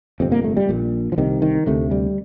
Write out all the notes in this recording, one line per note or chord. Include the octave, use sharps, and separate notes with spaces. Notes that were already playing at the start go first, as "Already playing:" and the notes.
G1 F2 C3 C4
A#3
A3
G3
A#1 A#2
F3
C2 C3 D#3
D#3
D2 C3 A3
G3